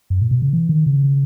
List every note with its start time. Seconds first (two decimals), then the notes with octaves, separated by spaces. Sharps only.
0.10 F#2
0.21 A#2
0.31 B2
0.42 C#3
0.53 E3
0.69 D#3
0.86 C#3